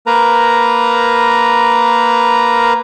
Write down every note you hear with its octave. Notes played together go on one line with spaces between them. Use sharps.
A#3 A#4 B4 A#5